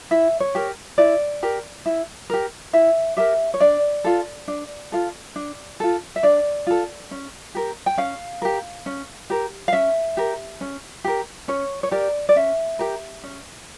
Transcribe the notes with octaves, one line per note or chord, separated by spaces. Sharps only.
E4 E5
C#5
G4 A#4
E4 D5
G4 A#4
E4
G4 A#4
E4 E5
G4 A#4 E5
C#5
D4 D5
F4 A4
D4
F4 A4
D4
F4 A4
E5
D4 D5
F4 A4
C#4
G4 A#4
G5
C#4 F5
G4 A#4
C#4
G4 A#4
F5
C#4 E5
G4 A#4
C#4
G4 A#4
C#4 C#5
C#5
G4 A#4 D5
D5
C#4 E5
G4 A#4
C#4